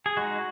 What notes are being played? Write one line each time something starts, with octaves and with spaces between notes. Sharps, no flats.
G#4
G#3 D#4 F#4